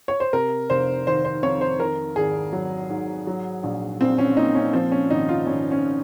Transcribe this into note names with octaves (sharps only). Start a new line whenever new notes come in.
C#5
C5
C3 A#4
F1 C5
D#3 C5
C5
F2 C#5
C5
D#3 A#4
G#1 G#4
F#3
G#2
F#3
A#1
A#1 C4
C#4
A#2 D#4
C#4
F3 C4
C#4
G#1 D#4
F4
G#1 C#4
C#4